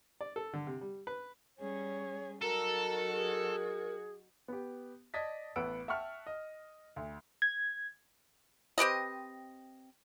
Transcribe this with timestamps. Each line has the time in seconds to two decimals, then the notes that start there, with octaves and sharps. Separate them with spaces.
0.21 D5
0.36 A4
0.54 D3
0.67 C3
0.81 G3
1.07 B4
1.58 G3 C#4 G#4 C#5
2.42 F#3 D#4 F#4 A4 A#4 A#5
3.13 G#4
4.48 B3 G4
5.14 D5 D#5 A5 G#6 A6 B6
5.56 A1 B3 B4 F#5 E6 D7
5.88 E5 F#5 G5 A5 C#6 F6
6.27 D#5
6.96 D2
7.42 G#6
8.78 C4 G4 B4 D#5